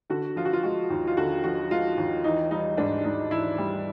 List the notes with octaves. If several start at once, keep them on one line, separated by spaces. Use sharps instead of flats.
D3 F#4
F3 F4
F#4
F4
G#3 F#4
D#2
F4
D3 F#4
F3 F#4
G#3 F4
D#2
E3 D#4
G3 D#4
G#2 D4
G#2 D#4
E3 E4
G3